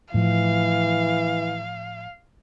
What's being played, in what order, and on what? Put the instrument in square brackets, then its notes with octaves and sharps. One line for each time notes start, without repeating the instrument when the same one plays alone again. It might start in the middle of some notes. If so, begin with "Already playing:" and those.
[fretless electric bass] A2 F3 [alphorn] E3 [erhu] F5